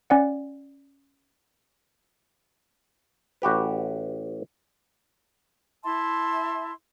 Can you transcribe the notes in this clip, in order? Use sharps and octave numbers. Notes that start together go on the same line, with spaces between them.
C#4 D5 F#5
A1 F#4 G4 B4
E4 E5 A5 C6